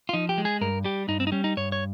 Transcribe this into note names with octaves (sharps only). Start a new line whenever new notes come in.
F4
F3 D#4
G4
G#3
G#4
G2 A#4
G3 G4
G2 D#4
C4
D#4
G3 C#4
D#4
G2 C#5
C#5